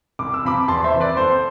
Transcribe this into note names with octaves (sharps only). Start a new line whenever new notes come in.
C2 D6
E6
C3 F3 B5 D6
E2 A5 C6
C5 E5
C3 E3
B4 D5
F2 A4 C5